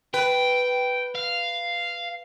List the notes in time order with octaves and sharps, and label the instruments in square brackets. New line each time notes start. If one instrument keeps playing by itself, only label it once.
[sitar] B4 [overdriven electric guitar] G5
[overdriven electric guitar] F5